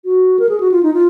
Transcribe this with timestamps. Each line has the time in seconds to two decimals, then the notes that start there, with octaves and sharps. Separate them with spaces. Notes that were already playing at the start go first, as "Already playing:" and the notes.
0.05 F#4
0.39 A#4
0.49 G#4
0.60 F#4
0.72 F4
0.83 D#4
0.94 F4